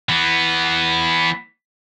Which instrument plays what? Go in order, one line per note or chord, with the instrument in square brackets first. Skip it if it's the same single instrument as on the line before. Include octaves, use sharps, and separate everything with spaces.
[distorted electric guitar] E3 B3